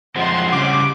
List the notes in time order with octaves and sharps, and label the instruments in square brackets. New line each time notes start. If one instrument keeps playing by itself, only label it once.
[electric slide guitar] F3 G#3 C4 [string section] F#5 C6
[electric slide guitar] C#3 G3 [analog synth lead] D6